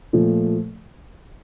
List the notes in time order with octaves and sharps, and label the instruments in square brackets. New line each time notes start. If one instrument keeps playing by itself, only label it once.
[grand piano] A#2 F3 A3